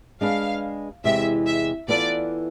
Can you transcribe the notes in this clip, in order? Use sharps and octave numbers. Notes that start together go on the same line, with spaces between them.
G#3 D4 G#4 B4 F5
E2 C3 G#3 C4 E5
E5
E3 B3 F4 A4 D5